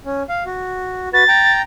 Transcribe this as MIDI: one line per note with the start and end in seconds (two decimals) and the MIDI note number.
0.05 0.23 61
0.29 0.44 77
0.46 1.09 66
1.13 1.24 66
1.13 1.24 71
1.13 1.58 93
1.28 1.62 79
1.28 1.62 82